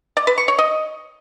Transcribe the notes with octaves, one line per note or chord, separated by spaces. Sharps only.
D5
B4
C#6
C#5
D#5